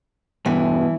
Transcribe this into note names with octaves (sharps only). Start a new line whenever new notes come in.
G2 B2 E3